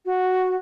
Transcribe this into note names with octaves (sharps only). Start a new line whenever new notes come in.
F#4